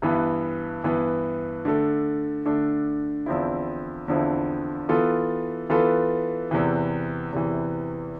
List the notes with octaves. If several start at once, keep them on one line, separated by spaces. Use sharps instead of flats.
G2 E3 B3 E4
G2 E3 B3 E4
D3 A3 D4 A4
D3 A3 D4 A4
E2 D3 F3 C4 E4
E2 D3 F3 C4 E4
E3 B3 F4 A4
E3 B3 F4 A4
E2 C3 E3
E2 C3 E3